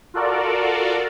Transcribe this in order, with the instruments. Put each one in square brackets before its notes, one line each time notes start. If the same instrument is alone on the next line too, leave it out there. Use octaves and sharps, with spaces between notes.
[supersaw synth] F4 F#4 A4 A#4 D5